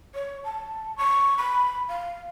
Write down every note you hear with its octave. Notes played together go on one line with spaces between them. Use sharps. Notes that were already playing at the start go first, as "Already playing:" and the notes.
C#5
A5
C#6
B5
F5